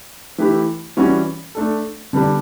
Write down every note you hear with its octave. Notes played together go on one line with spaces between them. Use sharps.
E3 A3 E4 G4 B4
E3 G3 C#4 F#4
A3 D4 A4
D3 G3 B3 D4